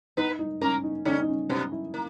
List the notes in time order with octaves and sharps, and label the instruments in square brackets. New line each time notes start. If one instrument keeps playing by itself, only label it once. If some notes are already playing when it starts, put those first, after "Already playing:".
[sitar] B3 B4 [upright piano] D#4
[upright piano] D#4
[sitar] A#3 A#4 [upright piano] C#4
[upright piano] D#4
[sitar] C#3 C#4 [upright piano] D#4
[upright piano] D#4
C#4
[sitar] B2 B3 [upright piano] C#4
[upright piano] E4
[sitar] A#3